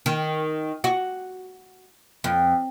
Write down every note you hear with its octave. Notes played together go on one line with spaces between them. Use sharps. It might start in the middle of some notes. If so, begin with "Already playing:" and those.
D#3
F#4
F2